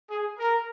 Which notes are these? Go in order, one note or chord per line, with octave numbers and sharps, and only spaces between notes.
G#4
A#4